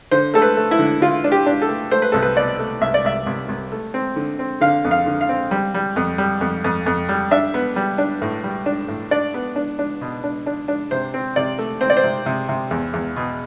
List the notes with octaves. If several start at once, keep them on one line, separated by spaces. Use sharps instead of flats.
D3 C5
A3 A4
B4
A3
E4
D3
D3 F4
D4
G4
D4
A4
A3
A3 C5
B4
C2 A4
B4
B2 D5
A3
C2 E5
D5
C2 E5
C2
C2
A3
C4
D3
C4
D3 F5
F2
F5
D3
F5
C4
G3
G3
F2
G3
F2
F2
F2
G3
D4 E5
B3
G3
D4
A2
G3
D4
A2
D4 D5
B3
D4
D4
B2
D4
D4
D4
C3 C5
C4
C3 D5
A3
C4 C5
D5
C5
C3
C3
C3
E2
E2
B2